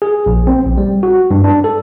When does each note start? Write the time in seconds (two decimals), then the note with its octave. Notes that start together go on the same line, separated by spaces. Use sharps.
0.02 G#4
0.26 A#1
0.47 C4
0.65 A#1
0.78 G3
1.03 F#4
1.31 G2
1.44 D4
1.64 A4